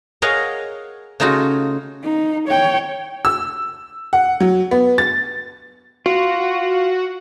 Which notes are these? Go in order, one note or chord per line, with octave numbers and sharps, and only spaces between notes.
G#4 A#4 C#5 D#5 F5 F#5
C#3 A3 D#4 F4 F#4
D#4
C#5 G5
E6
F#5
F#3
B3
A6
F4 F#4